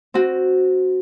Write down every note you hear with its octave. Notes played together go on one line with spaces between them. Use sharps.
C4 F#4